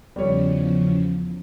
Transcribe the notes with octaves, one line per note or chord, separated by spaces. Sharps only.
E2 C#3 F3 G3 C#5